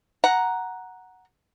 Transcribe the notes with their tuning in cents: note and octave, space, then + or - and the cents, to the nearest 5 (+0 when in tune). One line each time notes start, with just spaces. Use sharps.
F#5 +0 A#5 +5